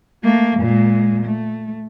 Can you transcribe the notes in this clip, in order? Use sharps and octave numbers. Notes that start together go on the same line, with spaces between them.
A3 A#3
A#2 G#3
A3